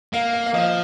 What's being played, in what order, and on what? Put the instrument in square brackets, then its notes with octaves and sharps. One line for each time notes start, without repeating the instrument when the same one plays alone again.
[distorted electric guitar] A#3 [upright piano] F5
[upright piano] F5
F5
[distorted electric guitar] F3 [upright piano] D#5